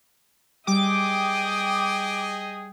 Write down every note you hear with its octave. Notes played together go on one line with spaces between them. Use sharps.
G3 G#4 D#5 G5 D6 D#6